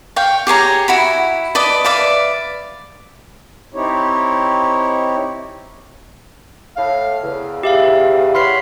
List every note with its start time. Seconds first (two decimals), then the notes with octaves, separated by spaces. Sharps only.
0.16 F5 G5 C#6
0.47 G4 G#4 C#5 A#5
0.88 E4 F#4 B5
1.55 B4 D5 D#5 A5
1.84 B4 D5 E5 F5
3.74 C4 D#4 E4 G4 C#5
6.76 A2 F5
7.23 E2 C#3
7.63 G4 E5 F5
8.35 C#5 F#5 B5 C6 F6 C7